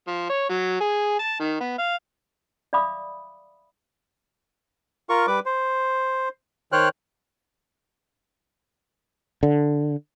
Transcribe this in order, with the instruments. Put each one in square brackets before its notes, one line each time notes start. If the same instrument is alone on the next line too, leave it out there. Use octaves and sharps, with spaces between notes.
[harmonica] F3
C#5
F#3
G#4
A5
D#3
B3
F5
[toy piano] D5 E5 F5 B5 D6 D#6
[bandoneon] F4 A#4 C#6
G3 B4 D6
C5
D#3 C5 C#5 G5 F6 F#6
[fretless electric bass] D3